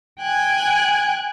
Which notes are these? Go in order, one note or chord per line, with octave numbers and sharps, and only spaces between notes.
G5 G#5 F#6 G#6